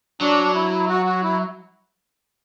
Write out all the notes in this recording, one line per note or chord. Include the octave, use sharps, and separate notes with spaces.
F#3 D4
E4
F#4
F#4
E4